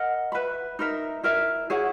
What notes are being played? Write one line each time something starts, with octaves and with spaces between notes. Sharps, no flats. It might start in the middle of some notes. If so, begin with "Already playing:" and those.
Already playing: A#4 D#5 F#5
B4 E5 B5
D#4 A#4 E5
E4 A#4 E5
E4 G#4 C#5 F#5